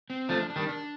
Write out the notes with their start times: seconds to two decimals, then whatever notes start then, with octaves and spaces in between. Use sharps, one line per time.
0.10 C4
0.29 F3 A3 D4
0.50 D4
0.56 D#3 G3
0.69 D4